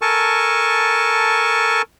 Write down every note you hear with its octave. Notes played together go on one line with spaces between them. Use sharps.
A4 A#4 G#5 A5 C#6